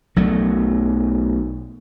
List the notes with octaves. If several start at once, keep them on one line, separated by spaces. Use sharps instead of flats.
B1 F#3 A3